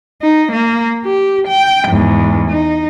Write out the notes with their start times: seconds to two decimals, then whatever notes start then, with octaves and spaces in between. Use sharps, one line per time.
0.22 D#4
0.52 A#3
1.05 G4
1.48 G5
1.88 E2 G#2
2.50 D#4